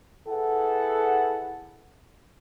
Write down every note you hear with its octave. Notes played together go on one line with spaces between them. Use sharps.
E4 G#4 A4 B4 F#5